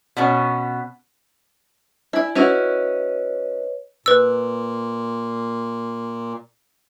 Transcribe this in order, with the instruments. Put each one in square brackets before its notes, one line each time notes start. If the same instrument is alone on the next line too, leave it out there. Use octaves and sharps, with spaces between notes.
[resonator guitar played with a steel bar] B2 B3 C#4
[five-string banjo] E4 [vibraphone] D5 G#5
[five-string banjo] C#4 E4 F#4 [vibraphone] B4 C#5 D#5
[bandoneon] A#2 [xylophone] B4 E6